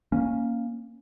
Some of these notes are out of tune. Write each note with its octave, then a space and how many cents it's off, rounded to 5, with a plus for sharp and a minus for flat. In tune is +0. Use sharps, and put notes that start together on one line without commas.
A#3 +0 C#4 -5